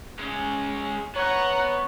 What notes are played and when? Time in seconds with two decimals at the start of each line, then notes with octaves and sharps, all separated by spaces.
0.19 G#3 C#4
1.16 B3 C#5 F#5 A#5